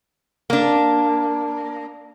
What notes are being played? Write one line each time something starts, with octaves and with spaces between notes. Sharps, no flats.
A#3 D4